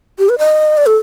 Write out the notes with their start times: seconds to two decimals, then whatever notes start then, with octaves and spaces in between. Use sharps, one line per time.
0.19 G4
0.29 B4
0.39 D#5
0.77 D5
0.86 A4